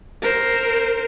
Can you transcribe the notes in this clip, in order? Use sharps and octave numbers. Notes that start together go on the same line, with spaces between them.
A#4 C5